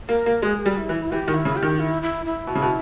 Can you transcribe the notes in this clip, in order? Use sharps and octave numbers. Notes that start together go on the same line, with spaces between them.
A#3 A#4
A#3
G#3 G#4
G3
E4
E3
E3 G4
D#3
E4
C#3
G4
D#3
E4
E4
E4
B2
C#3
B2